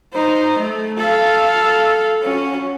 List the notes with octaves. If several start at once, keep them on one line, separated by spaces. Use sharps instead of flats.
D#4 C5
A3
A4 F5
C#4 F#4